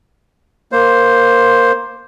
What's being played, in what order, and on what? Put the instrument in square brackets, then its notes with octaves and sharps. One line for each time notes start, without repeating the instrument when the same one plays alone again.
[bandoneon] A#3 C5